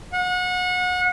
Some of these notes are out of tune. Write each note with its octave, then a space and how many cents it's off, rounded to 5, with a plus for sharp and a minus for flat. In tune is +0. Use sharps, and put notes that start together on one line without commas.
F#5 -30